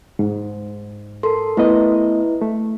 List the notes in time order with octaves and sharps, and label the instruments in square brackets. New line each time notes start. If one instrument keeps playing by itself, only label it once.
[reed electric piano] G#2
[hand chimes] A4 A#4 C6
[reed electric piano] A3 B3 D#5 [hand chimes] E4 B4
[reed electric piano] A3